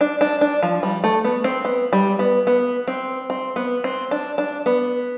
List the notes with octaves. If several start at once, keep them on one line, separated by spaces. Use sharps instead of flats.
D4
D4
D4
F3
G3
A3
B3
C4
B3
G3
B3
B3
C4
C4
B3
C4
D4
D4
B3